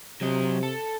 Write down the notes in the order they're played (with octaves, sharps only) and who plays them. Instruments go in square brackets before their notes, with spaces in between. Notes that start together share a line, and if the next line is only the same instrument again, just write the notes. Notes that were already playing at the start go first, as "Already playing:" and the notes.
[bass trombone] C3 [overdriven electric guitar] F#3 D#5
[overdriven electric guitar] A4